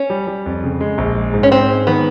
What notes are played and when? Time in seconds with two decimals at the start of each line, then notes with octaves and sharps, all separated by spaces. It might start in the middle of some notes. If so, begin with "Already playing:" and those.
Already playing: C#4
0.10 G3
0.27 G3
0.46 F2
0.64 C#3
0.81 G#3
0.98 A#1
1.15 G#3
1.34 G#2
1.43 C#4
1.51 G#2 C4
1.69 G#3
1.87 D#3 B3